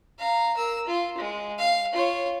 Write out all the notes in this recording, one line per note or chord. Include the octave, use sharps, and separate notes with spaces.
F5 A#5
A#4 E6
F4
G#3
F5
F4 C#5